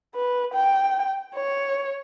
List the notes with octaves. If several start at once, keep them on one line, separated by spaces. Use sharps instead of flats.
B4
G5
C#5